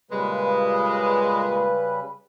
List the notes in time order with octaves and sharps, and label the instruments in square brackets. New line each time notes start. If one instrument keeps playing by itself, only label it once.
[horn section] A#2 G#3 [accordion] C#3 G3 B4